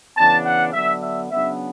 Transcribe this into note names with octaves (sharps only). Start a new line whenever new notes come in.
C#3 E3 B3 D4 A5
F#5
D3 F#3 B3 D4 E5
E5
C#3 F#3 B3 D4 E5